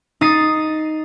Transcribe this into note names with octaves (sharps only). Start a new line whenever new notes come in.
D#4 D#6 A6 C7